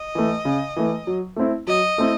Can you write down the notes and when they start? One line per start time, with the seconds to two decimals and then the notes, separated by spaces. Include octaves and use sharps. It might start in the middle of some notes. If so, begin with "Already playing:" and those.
Already playing: D#5
0.15 E3 A3
0.45 C#3
0.77 E3 A3
1.07 F#3
1.36 A3 C4 E4
1.67 F#3 D#5
1.98 A3 C4 E4